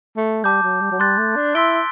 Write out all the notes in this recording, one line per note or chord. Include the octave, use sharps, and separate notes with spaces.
A3
G3 A5 D6 G6
F#3
G3
F#3
G3 C6 F#6 A6
A3
D4
E4 C6 E6 B6 D7 G7